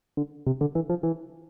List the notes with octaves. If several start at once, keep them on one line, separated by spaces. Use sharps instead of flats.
D3
C3
D3
E3
F3
E3